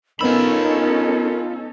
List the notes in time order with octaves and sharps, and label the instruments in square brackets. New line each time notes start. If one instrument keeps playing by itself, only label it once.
[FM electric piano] B3 E6 [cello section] C#4 D#4 A4 [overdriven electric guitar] F4 B5 [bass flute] A#4